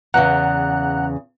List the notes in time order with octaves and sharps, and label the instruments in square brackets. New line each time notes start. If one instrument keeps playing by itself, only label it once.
[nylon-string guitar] E2 C#3 [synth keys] F#5 A#5 F#6